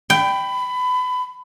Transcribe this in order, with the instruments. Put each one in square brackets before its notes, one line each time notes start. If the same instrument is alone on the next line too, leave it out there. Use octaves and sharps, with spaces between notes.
[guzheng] G5 [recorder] B5